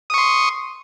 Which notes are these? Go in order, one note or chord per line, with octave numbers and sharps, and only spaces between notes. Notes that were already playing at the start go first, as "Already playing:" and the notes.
C6 C#6 D#6